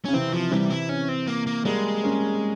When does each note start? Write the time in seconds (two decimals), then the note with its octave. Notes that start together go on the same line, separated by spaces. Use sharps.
0.05 C#3 C#4
0.13 C3 E3 C4
0.33 F3
0.51 C3 E3 G3
0.70 E4
0.89 C#4
1.09 C4
1.27 A#3
1.47 A#3
1.65 G3 G#3 A#3
2.04 A#3 C#4